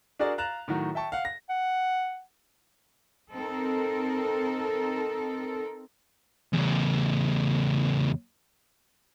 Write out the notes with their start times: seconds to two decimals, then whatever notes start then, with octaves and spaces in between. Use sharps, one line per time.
0.19 D4 F#4 G#4 A#4 D5
0.38 F5 A#5 F#6 A6 E7 F7
0.68 A2 D#3 F#3 F#4
0.95 E5 G5 A5 C#6
1.12 F5 F#5
1.25 A#6
1.50 F#5
3.33 C4 D#4 A4 A#4
6.53 E2 C#3